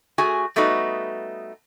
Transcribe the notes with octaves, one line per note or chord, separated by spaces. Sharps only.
A3 F#4 G#4 G#5
G3 A3 B3 D#4 F#4 B4